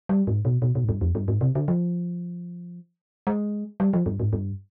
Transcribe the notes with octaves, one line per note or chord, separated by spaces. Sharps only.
G3
G#2
B2
B2
B2
G#2
G2
F2
G2
G#2
C3
D3
F3
G#3
G3
F3
G2
G#2
G2